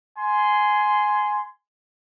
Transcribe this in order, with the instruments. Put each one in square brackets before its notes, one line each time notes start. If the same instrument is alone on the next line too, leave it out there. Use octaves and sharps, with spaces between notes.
[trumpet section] G#5 C6